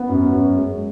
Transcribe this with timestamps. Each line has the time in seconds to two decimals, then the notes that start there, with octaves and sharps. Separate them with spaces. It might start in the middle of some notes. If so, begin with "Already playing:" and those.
Already playing: B3
0.09 F#2
0.32 F#2
0.57 G#3